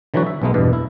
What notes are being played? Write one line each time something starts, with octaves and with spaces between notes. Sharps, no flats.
D3 E3 F#3 A3 F#4
E5
B1 B2 G#3 A3 B3
E2 G2 B2
E4